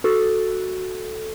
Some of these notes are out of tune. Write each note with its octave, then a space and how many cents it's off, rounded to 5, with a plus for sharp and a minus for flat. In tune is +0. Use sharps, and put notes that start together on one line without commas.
F#4 +0 A4 +0